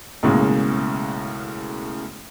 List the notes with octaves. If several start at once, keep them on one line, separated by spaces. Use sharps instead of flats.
B1 A2 C#3 G#3 A#3